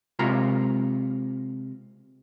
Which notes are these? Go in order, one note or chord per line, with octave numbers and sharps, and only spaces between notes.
C3 G#3 F4 A#5